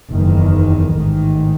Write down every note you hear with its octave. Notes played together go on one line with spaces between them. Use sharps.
F#1 E2 D#3
A1 G#2 D#3